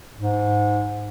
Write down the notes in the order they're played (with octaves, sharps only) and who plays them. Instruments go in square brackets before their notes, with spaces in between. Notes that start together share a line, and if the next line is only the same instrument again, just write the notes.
[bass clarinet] G#2